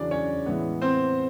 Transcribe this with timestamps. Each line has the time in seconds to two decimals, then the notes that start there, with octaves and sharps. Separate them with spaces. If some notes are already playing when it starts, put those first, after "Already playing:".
Already playing: E2 C#3 F#3 D4 D5
0.11 C#4 C#5
0.46 A2 E3 G#3 B3
0.82 C4 C5